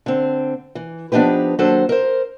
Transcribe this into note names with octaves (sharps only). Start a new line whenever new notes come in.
D3 C4
E3
F3 B3 D4 D#4 G4 B4
D#2 F#3 D4 A4 C5
A#4 C5